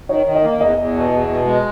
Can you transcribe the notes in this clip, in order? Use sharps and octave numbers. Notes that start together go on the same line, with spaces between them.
D#3 C#5
D#3
D#5
A#3
E2 D#5
E2
B2
E2
B2
G#3